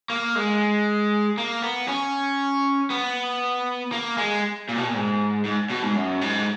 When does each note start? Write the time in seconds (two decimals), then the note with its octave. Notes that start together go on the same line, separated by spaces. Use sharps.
0.10 A#3
0.35 G#3
1.38 A#3
1.62 B3
1.88 C#4
2.90 B3
3.92 A#3
4.18 G#3
4.69 A#2
4.78 B2
4.86 A#2
4.94 G#2
5.45 G#2
5.70 B2
5.83 G#2
5.95 F#2
6.21 G#2